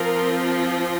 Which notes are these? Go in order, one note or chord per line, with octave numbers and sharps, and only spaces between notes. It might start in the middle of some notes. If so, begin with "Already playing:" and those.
Already playing: F3 C4 A#4